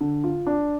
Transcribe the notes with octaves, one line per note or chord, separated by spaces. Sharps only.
D3
F4
D4